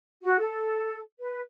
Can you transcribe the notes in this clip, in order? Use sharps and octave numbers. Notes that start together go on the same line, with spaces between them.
F#4
A4
B4